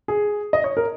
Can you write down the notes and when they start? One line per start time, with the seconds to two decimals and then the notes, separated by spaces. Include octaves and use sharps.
0.08 G#4
0.53 D#5
0.64 C#5
0.77 A#4